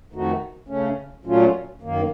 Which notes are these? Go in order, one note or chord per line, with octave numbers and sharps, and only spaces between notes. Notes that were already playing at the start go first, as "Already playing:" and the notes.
F2 D#3 A3 D#4 F#4
C#3 A3 C#4
A#2 F#3 A3 C#4 F4
F#2 D#3 A#3